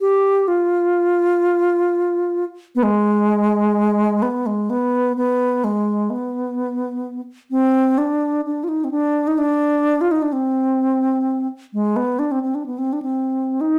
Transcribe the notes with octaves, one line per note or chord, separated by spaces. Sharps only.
G4
F4
B3
G#3
B3
G#3
B3
B3
G#3
B3
C4
D4
D4
F4
D#4
C4
D4
D#4
D4
F4
D#4
D4
C4
G#3
B3
D4
C4
C4
D4
B3
C4
D4
C4
D#4